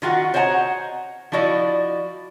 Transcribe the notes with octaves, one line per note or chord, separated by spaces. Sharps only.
D#3 F4 F#4 F#5
C5 C#5 D#5 F#5 G5 A#5
F3 E4 F#4 D5 D#5